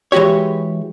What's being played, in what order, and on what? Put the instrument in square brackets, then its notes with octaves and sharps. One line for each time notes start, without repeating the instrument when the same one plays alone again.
[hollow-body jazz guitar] E3 G#3 F#4 G4 C#5